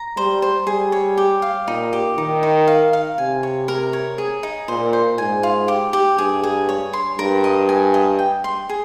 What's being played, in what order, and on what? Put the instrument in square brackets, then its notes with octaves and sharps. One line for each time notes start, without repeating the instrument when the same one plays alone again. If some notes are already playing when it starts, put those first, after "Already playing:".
Already playing: [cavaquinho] A#5
[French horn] G3 [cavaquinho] C5
[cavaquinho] C5
[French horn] G3 [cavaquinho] G#4
[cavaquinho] C#5
G4
F5
[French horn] A#2 [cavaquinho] D#4
[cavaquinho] G4
[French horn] D#3 [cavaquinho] D#4
[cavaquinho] D#4
F5
F5
[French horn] C3 [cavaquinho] G#5
[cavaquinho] C#5
A#4
C#5
G#4
D#4
[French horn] A#2 [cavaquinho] C5
[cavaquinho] C5
[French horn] G#2 [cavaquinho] G#5
[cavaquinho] F4
G4
G4
[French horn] G2 [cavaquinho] G#4
[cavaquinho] G#4
C#5
C6
[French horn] G2 [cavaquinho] A#4
[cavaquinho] D#5
G#5
D#5
G5
C6
G#4